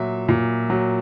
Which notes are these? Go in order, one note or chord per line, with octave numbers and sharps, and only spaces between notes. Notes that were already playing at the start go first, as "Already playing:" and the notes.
Already playing: A#2 F#3 E5
A#2
F#3